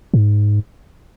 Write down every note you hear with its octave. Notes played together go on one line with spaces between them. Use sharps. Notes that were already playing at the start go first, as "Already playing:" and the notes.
G#2